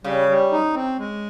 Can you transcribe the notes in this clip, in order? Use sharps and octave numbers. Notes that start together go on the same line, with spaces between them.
C#3 G3
G3
D#4
C4
G#3